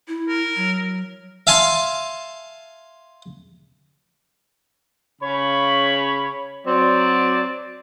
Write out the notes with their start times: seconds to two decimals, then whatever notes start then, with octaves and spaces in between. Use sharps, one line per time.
0.08 E4
0.28 A#4
0.56 F#3
1.47 E5 F5 G#5 A5 C6
5.22 C#3 C#5 B5
6.66 F#3 C4 D5